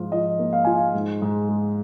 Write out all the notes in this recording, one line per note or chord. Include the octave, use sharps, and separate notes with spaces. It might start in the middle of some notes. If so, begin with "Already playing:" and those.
Already playing: G#2 F3 F4
F3 D#5
A#3
F5
F4 G#5
F5
G#2
G#2
G#3